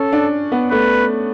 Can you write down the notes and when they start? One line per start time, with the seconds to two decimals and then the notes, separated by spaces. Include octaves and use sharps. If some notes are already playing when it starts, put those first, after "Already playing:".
Already playing: C#4 A4
0.12 D4
0.52 B3
0.71 A3 B4